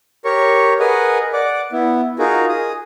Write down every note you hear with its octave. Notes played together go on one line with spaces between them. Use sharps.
G4 A#4 C#5 C#6
G#4 A#4 B4 D#5 F#5 G#5
D5 F#5 D6
B3 E4
D#4 F4 F#4 G#4 A#4
G#4 D#6